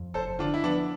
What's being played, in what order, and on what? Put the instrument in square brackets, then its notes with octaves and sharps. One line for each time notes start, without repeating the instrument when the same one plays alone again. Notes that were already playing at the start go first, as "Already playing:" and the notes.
Already playing: [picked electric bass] F2
[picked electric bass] F1 [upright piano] A4 C5
[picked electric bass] D3 [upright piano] D4 F4
[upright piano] E4
[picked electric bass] F3 [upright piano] B3 D4